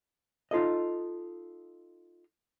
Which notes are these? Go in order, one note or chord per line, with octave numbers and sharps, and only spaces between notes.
D#4 F4 A4 D#5